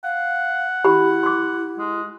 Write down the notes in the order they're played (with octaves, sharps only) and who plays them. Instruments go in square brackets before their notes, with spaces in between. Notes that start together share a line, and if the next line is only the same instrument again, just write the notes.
[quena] F5 [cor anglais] F#5
[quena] E4 [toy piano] G4 B5
[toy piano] C6 D6
[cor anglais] G#3